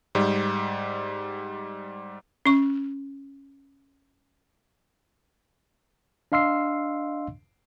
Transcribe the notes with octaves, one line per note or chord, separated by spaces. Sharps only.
G#2 G3
C#4 C#6
D4 D#5 F5 C6 E6 C7